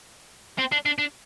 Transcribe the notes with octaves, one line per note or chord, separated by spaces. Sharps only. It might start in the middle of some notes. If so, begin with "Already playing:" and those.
C4
D4
D4
D4